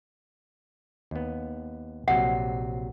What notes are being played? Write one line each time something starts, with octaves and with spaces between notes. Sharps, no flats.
D#2 B3
A#1 C3 F#3 F#5